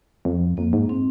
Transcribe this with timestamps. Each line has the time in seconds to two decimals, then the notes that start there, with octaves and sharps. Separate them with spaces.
0.25 F2
0.57 F2 A#3
0.73 G#2
0.89 C4